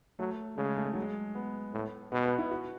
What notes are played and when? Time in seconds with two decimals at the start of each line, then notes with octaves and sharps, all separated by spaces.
0.19 F#3 A3
0.57 C#3 G#3
0.77 A3
0.85 G#3
0.93 F#3
1.02 G#3
1.35 B3
1.73 A2
2.12 B2 B3
2.26 B3
2.38 E4
2.51 F#4